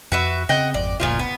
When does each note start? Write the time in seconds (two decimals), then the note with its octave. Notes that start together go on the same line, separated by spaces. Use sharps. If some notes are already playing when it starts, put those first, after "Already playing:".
0.12 F2 F#4 B4 E5
0.49 C#3 C4 D#5 F#5 G5
0.74 G#1 F2 D5
1.00 F#1 D2 A#2 F3 F4
1.19 B3